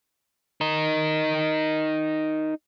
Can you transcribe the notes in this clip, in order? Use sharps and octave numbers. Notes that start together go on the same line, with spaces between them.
D#4 A#4